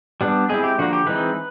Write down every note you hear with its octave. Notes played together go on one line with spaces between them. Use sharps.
G3 B3 D4
G#3 C4 E4 G#4
G4
D3 F3 A#3 F#4
G4
E3 G#3 C4 D#4 B4